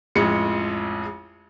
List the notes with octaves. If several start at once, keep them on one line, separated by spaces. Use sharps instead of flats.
A1 F2 G#3 C#7